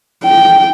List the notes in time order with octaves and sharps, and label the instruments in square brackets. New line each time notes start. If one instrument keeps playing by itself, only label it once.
[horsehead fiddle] G5